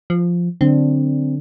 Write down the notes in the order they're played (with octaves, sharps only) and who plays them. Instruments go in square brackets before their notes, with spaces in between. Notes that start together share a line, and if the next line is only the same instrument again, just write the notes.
[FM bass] F3
[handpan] D3 F#3 D4 [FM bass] C4